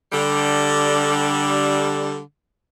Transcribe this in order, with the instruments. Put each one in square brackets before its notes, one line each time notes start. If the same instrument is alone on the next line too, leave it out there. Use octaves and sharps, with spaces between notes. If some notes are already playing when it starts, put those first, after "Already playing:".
[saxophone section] D3 G3